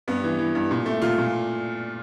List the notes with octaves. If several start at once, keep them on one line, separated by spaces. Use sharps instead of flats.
G2 B3
E3
E3
G2
A#2
A3
A#2 F4
A#2